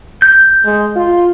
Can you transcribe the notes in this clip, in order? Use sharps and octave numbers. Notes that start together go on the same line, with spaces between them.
G6
G#3
F4